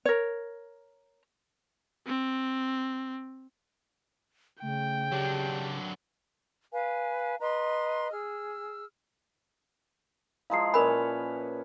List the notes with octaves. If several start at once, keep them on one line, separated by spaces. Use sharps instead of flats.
A#4 C#5
C4
C#3 A3 G5
F#3 D4 G4
B4 F5 G#5
B4 D#5 A#5 C6
G#4 E6 F6
F3 G#3 E4 F5 A#5 C7
A#2 C#4 A#4 B4 G#5 B5 F7